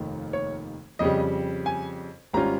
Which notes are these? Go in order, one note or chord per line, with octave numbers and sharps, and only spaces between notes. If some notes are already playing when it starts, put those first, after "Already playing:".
Already playing: F1 D#2 D#3
C#5
F2 C#3 G3 D#5
G#5
G#1 G3 C#4 F4 A#5